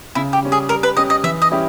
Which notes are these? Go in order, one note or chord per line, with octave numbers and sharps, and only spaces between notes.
C#3 E4
G4
G3 C#4
G#4
G3 A#4
B4
C#4 G4 D#5
D#5
E3 E5
D#5
G3 C#4 E4 G4